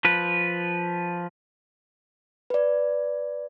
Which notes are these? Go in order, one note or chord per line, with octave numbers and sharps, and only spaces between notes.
F3 B4
B4 D5